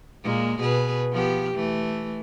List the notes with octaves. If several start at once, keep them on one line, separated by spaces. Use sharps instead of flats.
A#2 G#3 A#3
B2 G#4 B4
F3 B3 G4
E3 A3